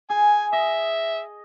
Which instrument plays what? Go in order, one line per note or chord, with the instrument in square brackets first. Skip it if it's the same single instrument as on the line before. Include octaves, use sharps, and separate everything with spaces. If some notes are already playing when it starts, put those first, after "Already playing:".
[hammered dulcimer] G#4 [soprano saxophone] G#5
[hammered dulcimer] D#5 [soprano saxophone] E5